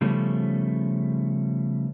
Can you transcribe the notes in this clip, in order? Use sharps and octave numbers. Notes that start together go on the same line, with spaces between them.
C#3 F3 G3 A3 B3 C#4